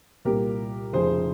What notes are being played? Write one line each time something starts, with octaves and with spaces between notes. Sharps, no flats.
C2 A#2 G3 A#3 G4 A#4
F1 F2 C#3 F3 G#4 C5